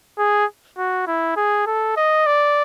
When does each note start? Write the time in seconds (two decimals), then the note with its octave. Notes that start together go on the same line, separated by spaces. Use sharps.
0.19 G#4
0.78 F#4
1.07 E4
1.37 G#4
1.66 A4
1.97 D#5
2.27 D5